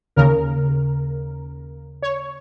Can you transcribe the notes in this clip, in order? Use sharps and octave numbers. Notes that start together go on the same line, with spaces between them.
D#2 C#3 A#4
C#5